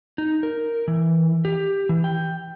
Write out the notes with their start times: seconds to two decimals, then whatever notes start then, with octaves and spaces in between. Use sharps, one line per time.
0.18 D#4
0.43 A#4
0.88 E3
1.45 G4
1.89 E3
2.04 G5